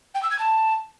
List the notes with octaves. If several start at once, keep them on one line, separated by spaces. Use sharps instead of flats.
G5
E6
G#6
A5